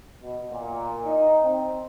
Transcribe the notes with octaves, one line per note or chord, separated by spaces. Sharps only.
B2
A#2
D#4
C4